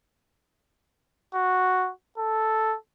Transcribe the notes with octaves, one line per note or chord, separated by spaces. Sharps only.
F#4
A4